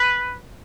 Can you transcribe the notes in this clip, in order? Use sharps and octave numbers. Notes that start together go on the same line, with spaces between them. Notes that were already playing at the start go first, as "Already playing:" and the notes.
Already playing: B4